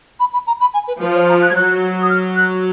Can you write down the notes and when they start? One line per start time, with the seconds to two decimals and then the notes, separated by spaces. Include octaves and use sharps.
0.20 B5
0.33 B5
0.47 A#5
0.61 B5
0.74 G#5
0.88 B4
1.01 F3 B4
1.15 C#5
1.29 A#5
1.42 F#6
1.50 G#6
1.55 F#3 F#6
2.02 D#6
2.10 F6
2.36 F#6